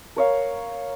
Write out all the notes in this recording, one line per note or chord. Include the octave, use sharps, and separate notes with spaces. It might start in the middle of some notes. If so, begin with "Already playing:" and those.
A#4 C#5 F5